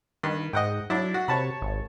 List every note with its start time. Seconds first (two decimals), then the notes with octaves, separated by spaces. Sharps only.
0.23 G2 D#3
0.53 G#2 D#5 F#5 G5
0.90 F#3 D4 E4
1.14 F#4
1.28 C3 C#5 A5 B5
1.62 G#1